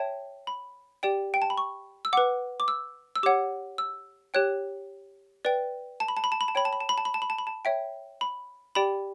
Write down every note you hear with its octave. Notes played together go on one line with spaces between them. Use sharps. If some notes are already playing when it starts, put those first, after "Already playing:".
Already playing: C#5 E5 G5 A5
B5
G4 D5 G5
G5
A5
B5
C#6
E6
B4 F#5 D6
D6
E6
E6
G4 C#5 F#5 D6
E6
G4 C#5 G5 F#6
B4 D5 G5
A5
B5
A5
B5
A5
B5
A5
C#5 G5 B5
A5
B5
A5
B5
A5
B5
A5
B5
A5
B5
A5
C#5 E5 G5
B5
G4 D5 G5 B5